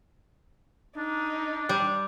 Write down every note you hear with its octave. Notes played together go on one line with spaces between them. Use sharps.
D4 D#4
G3